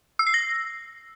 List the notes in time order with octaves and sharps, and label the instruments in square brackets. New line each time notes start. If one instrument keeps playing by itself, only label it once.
[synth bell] E6
C7
A#6